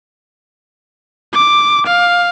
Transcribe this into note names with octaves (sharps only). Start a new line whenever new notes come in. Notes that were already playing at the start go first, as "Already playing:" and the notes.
D6
F5